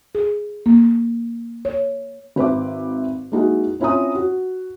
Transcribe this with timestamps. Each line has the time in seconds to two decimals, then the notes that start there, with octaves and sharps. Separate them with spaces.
0.15 G#4
0.66 A#3
1.65 C#5
2.36 G#1 B4 C5 E5 D6
3.32 G#3 A#3 D#4 E4 F#4
3.80 C4 C#4 E4 F4 A#5 D#6
4.15 F#4